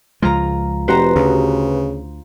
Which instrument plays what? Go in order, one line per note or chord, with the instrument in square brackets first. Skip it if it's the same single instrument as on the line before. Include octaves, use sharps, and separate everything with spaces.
[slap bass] C#2 F3 G#3 [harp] F4 A#5
[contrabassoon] F1 [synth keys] F#4 G4 B4 [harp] C5 A#5
[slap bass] D2 [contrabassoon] C#3